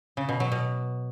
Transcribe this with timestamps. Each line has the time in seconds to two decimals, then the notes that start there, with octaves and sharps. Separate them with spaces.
0.17 C#3
0.29 B2
0.40 F#3
0.52 B2